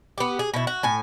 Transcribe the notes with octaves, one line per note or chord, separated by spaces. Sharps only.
B3 G4
G#4
B2 E4
F#4
A2 G#5